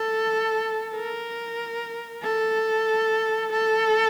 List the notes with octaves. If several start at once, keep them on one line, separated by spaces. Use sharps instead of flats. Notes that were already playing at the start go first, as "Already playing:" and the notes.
Already playing: A4
A#4
A4
A4